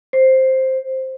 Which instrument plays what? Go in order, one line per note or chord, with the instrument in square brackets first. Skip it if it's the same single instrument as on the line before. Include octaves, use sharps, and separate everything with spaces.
[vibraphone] C5